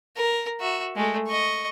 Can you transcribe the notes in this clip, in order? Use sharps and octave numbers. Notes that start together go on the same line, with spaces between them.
A#4
F#4 E5
G#3 A3
D#5 C#6